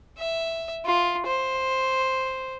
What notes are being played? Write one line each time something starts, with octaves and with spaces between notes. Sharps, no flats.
E5
F4
C5